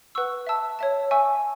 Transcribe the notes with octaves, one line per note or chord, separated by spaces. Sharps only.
B4 F#5 C#6 E6
E5 A5 E6
C#5 E5 A5
E5 G#5 C#6 E6